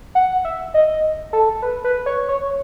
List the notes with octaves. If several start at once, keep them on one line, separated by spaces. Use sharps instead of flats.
F#5
E5
D#5
A4
B4
B4
C#5
C#5